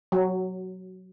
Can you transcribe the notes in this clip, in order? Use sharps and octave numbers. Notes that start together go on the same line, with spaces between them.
F#3